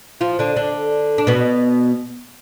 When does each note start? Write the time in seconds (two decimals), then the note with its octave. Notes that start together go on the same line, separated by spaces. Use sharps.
0.21 F3 F4
0.39 D3 D4
0.56 D3 D4
1.18 D4
1.27 B2 B3